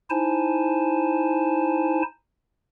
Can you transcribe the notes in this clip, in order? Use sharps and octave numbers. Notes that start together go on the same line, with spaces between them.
D#4 E4 C5 G#5 A5